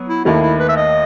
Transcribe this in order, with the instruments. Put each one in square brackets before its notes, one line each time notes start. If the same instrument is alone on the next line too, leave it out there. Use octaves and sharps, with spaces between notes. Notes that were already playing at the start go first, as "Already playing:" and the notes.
Already playing: [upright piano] F#3 B3
[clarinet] E4
[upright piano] D#2 D#3 A3 [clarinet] E4
[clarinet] E4
B4
E5
D#5